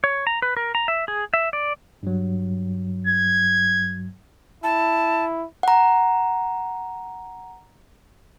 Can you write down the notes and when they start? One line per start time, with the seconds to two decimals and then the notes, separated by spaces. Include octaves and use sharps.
0.04 C#5
0.27 A#5
0.42 B4
0.57 A#4
0.75 A#5
0.88 E5
1.08 G#4
1.34 E5
1.53 D5
2.03 G2 F#3
3.07 G#6
4.64 E4 A5
5.63 F#5 A#5